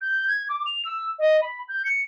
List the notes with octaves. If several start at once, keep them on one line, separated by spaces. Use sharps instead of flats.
G6
G#6
D6
F7
E6
D#5
B5
G6
C#7